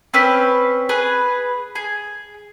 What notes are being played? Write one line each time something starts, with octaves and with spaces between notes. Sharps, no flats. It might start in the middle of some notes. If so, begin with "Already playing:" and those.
C4 C#4 B4 E6
G#4 B4
G#4